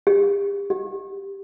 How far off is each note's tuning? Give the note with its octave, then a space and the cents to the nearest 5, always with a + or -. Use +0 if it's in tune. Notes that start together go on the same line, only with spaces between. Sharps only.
G4 +40
G4 +5